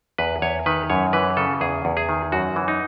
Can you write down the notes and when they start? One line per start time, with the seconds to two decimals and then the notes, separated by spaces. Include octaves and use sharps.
0.18 E2 B4
0.42 E2 C#5
0.66 D#3 B4
0.90 F#2 C#5
1.13 E3 B4
1.37 C#3 A4
1.61 E2 G#4
1.85 E2
1.97 G#4
2.09 D#3
2.32 F#2 F#4
2.56 E3
2.68 D#4